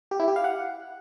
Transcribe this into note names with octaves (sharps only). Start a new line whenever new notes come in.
G4
E4
G4
F5
F#5